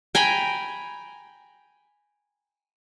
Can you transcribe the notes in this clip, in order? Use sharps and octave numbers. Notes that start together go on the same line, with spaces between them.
G5 G#5 A#5 B5